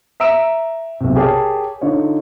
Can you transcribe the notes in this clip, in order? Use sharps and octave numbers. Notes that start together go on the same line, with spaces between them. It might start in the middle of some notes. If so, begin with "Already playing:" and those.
E5 A#5 E6 D7 E7
B1 C3
G4 G#4 A#4 C#5 A5
D3 D#4 F4 C#5